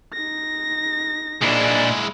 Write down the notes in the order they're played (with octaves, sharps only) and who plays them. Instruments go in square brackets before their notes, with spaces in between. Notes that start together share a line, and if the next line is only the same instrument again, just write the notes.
[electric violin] D#4 A#6
[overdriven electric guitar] A#2 D4 [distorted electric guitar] G#3 E4